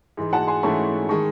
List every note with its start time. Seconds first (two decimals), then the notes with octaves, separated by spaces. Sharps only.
0.17 G#2 E3 G#3
0.33 F#5 A5
0.47 G#5 C6
0.63 G#2 E3 A3 C#4 E4 A5 C#6
1.09 D#3 G#3 A5 C#6